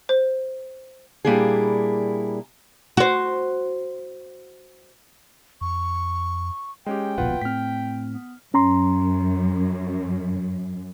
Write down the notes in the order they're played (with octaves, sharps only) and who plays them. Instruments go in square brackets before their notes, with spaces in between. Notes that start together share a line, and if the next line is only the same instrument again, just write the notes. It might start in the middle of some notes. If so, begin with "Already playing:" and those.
[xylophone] C5
[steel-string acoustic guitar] A#2 G3 A#3 D4 E4 G#4
[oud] F#4 C5
[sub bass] F2 [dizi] C#6
[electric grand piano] G#3 C#4 G4 [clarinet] G5
[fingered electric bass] D1 A#1 B2 [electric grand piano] F4 B4 F#5
[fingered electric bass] A2 C4 [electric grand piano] F6 B6
[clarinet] B3
[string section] F#2 [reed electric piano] C#4 A#5 C6